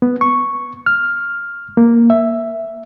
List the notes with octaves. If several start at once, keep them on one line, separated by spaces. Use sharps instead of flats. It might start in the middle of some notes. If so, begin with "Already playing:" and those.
B3
C#6
F6
A#3
E5